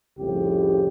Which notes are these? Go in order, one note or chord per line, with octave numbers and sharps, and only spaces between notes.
C2 F2 A2 C#3 G4